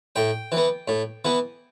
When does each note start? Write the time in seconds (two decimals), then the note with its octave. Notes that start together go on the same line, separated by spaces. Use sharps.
0.16 A2 G5
0.52 E3 B3
0.88 A2
1.25 E3 B3